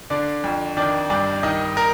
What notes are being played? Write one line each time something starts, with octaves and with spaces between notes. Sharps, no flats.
D3 D4 D5
F2
D#3 D4 D5
G2 D4 D5
D#3 D#4 D#5
A#4 A#5